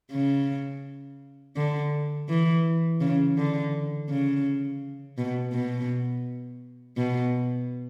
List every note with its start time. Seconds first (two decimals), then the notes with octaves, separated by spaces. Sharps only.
0.12 C#3
1.56 D3
2.29 E3
3.01 C#3
3.37 D3
4.10 C#3
5.18 B2
5.53 B2
6.97 B2